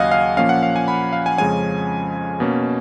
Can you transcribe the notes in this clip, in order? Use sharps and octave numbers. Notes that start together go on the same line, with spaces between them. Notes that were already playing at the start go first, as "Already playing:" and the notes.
Already playing: D#2 C#3 F#3 D#5 F5 F#5 G#5
F5
A#2 F3 A#3 C#4 F5
F#5
F5
G#5
B5
F5
G#5
F2 C#3 F3 G#3 C#4 G#5
B2 A#3 C#4